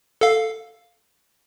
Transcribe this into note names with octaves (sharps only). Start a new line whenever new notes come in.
A4 F5